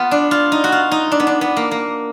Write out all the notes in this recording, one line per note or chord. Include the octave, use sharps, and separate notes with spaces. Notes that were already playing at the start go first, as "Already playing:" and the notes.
Already playing: B3 F4
D4
F4
D#4
F#4
F4
D#4
D4
B3
D4
B3
A#3
A#3